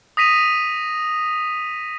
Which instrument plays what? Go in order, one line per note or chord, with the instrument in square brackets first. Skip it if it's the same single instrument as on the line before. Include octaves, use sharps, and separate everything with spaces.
[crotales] D#6 A#6 B6 D#7 F7